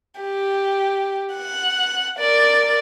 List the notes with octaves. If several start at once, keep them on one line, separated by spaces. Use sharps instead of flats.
G4
F#5
A#4 D5